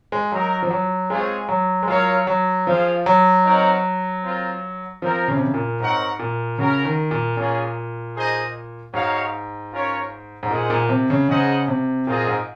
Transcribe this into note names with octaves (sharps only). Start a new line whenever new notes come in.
G#3
F#3 D#4 F#4 A#4
F3
F#3
G#3 C4 F4 G#4 C#5
F#3
G#3
F#3 F4 A#4 C#5 F5
F#3
F3 F4 G#4 C5 F5
F#3
C4 D#4 A#4 C#5 F#5
C4 F4 A#4
F3 C4 F4 A#4
C#3
C3
C#3
A#2
G#2 C4 D#4 A#4 C#5 F#5
A#2
C#3 C#4 F#4 A#4
D#3
A#2
A#2 A#3 C#4 F4 G#4
D#4 G#4 C5 D#5
G#2 D#4 F#4 C#5 F5
C#4 F4 A#4 C#5
G#2
A#2 G#3 D#4 G#4 C5 F#5
A#2
C3
C#3
C#3 D#4 G#4 C5 D#5 F#5
C3
A#2 C4 F4 G#4 D#5
G#2